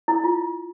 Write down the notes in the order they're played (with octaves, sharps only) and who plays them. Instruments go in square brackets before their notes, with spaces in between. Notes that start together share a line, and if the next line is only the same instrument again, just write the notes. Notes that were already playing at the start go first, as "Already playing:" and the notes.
[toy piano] E4
F4